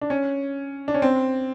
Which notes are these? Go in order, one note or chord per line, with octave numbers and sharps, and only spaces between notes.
D4
C#4
D4
C#4
C4